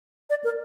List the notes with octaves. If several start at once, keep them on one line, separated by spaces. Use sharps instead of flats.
D5
A#4